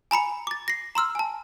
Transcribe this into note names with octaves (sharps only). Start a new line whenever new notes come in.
G#5 A#5 B5 C#7
D6 A6
A#6 C7
A#5 C6 E6 F6
G#5 A5